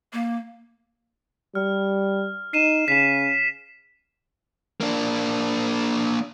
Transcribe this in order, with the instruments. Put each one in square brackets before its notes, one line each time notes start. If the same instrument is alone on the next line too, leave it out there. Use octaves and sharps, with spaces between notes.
[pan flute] A#3
[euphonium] G3 [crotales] F6
[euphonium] D#4 [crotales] C7 D#7 E7
[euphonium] C#3 [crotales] B6 E7
[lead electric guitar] A#3 D4